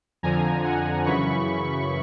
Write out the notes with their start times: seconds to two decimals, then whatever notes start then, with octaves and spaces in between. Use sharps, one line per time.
0.23 F2 D3 F3 G#5 A#5
0.64 F#5 G#5
1.06 F#2 C#3 E3 B5 C#6